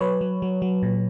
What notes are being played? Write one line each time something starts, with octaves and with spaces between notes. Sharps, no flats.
F#3 B4 C#5
F#3
F#3
F#3
A#2